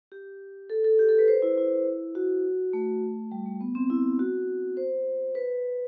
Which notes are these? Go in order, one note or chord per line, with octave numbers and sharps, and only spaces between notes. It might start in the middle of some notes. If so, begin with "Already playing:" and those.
G4
A4
A4
G4
A4
B4
C5
E4
E4
F#4
A3
G3
A3
B3
C4
E4
F#4
C5
B4